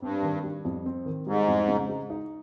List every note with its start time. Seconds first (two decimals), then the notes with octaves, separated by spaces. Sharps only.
0.01 G2 C4
0.23 D#3
0.44 G3
0.65 F2
0.86 C4
1.06 D#3
1.26 G#2 G3
1.48 F2
1.68 C#3
1.89 G#3
2.10 D#4